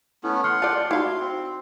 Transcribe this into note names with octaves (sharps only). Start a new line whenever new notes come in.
A3 B3 C#4 E4
F#5 C6 F6
F4 D5 A5 G6
D#4 E4 F#4 F5 C6
C4